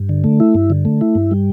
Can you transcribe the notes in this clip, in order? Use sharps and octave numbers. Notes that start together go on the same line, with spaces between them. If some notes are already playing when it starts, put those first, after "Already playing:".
Already playing: G2
D3
A3
E4
G2
D3
A3
E4
G2
G3